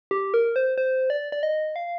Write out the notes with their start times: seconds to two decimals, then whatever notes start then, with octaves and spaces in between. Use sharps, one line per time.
0.11 G4
0.34 A#4
0.56 C5
0.78 C5
1.10 D5
1.32 D5
1.43 D#5
1.76 F5